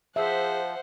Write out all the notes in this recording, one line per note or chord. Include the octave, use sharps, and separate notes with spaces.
F3 G#4 C5 E5 F#5